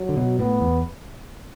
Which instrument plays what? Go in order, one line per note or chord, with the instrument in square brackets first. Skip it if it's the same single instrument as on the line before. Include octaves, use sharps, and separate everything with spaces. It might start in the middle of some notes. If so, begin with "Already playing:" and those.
Already playing: [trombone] F#3
[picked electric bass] D3
B2
[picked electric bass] A2 [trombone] B3
[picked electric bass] E2